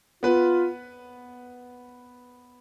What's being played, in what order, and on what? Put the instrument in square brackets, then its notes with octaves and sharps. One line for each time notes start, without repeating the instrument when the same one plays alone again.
[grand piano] B3 B4 [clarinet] F4